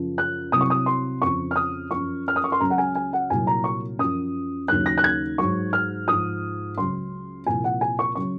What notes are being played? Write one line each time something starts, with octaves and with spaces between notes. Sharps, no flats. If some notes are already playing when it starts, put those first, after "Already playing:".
Already playing: F#2 C#3 F3
F#6
C2 C3 F#3 D#6
C#6
D#6
C6
F2 C#3 F3 C#6
F6
D#6
F#2 F3 C#6
F6
D#6
C#6
C6
C#2 C#3 F#3 A#5
F#5
G#5
G#5
F#5
C2 A#2 F#3 G#5
A#5
C#6
F#2 F3 D#6
D#2 C#3 F#3 F#6
A#6
F#6
G#6
G#2 F#3 C#6
F6
G#2 F3 D#6
C#2 C#3 F#3 C6
C2 A#2 F3 G#5
F#5
G#5
C#6
C#3 F#3 C#6